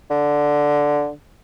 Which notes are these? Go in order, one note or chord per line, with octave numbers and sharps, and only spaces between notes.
D3